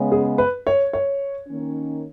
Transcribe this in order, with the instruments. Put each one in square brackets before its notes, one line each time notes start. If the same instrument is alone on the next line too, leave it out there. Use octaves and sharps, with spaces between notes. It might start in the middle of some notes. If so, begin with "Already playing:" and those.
Already playing: [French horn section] C#3 G#3 B3
[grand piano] G#4
B4
C#5
C#5
[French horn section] D#3 A#3 C#4